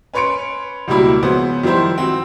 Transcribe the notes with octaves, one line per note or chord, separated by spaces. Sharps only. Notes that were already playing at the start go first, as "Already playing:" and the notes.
C#4 B4 C#5 C6 C#7 D7
C#2 B2 G3 A#3 E4 B5
C#3 F3 F#3 B3 C#4 C5
D#3 F3 G3 E4 C5
C4 F#4